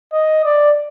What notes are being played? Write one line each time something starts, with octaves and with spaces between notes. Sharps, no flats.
D#5
D5